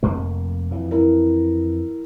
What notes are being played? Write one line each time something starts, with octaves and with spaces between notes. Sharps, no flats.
F1 F2 A#3
F2 E3
E4 A#4